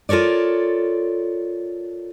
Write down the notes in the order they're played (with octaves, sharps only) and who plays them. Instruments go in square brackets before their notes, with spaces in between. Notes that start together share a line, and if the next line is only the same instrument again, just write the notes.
[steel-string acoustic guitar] F4 A4 A#4 C#5 D5